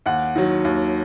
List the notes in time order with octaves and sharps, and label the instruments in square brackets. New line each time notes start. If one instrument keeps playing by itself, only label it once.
[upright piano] D#2 F#5
D#3 F#3
D#2